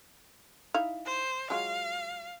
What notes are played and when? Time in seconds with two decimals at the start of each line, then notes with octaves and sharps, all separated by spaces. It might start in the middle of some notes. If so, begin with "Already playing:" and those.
0.74 D#4 E4 F5
1.06 C5
1.50 F#3 G#3 F4 F5